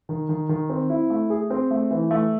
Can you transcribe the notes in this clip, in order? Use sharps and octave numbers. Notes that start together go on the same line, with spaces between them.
D#3
D#3
D#3
C4
E4
A3
G#4
C4
A3
E3
A3